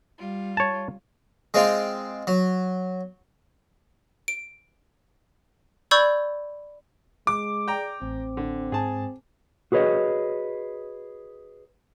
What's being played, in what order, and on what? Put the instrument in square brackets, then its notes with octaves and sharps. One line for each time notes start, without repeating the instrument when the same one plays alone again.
[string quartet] G3 F4
[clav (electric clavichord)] C#5 A5
[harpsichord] G#3 C4 F4 F5 G5
F#3
[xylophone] D7
D5 B5 C#6 E6 G6 G#6
[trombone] G#3 [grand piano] D6
[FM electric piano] G#4 D5 [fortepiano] G5 A#5
[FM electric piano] A1 [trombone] C4
[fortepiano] D3
[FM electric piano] G#2 [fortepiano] G#4 A5
[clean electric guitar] F#4 G#4 B4 C#5 D#5